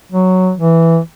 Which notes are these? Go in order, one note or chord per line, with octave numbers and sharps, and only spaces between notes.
F#3
E3